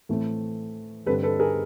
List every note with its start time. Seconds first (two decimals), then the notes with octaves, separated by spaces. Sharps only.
0.09 A2 E3 A3 C4
1.06 G2 D3 G3 C4 A4 B4
1.23 A4 B4
1.40 G#4 A#4